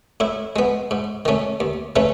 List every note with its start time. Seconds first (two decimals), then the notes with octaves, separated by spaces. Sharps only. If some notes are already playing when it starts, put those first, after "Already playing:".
0.20 A2 E4
0.56 G#3 B3
0.91 G#2
1.25 D#3 A3 C#4
1.60 D#2
1.96 C#3 E3 A3 C#4